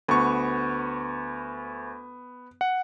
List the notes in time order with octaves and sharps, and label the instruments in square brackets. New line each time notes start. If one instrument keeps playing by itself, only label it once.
[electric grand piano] D2 C#6 [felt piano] B3
[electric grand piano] F#5